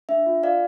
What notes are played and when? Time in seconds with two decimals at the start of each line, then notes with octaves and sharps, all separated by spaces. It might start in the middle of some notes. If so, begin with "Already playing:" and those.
0.09 D4 E5
0.26 F4
0.43 F4 D5 F5